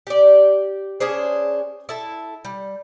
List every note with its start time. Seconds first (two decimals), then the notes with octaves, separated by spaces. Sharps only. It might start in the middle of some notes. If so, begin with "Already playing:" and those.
0.07 G4 D5
1.00 C#4 D4 G#4 C5
1.89 E4 A4
2.45 G3